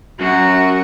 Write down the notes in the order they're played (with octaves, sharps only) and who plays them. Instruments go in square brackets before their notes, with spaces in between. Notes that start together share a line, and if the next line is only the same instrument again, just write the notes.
[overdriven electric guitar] F#2 [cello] F#4